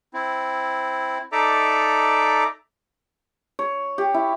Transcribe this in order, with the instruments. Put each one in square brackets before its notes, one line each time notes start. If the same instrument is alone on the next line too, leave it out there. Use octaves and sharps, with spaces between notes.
[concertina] C4 E4
D#4 A4 D5 E5 A#5 D6
[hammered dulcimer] C#5
G4
E4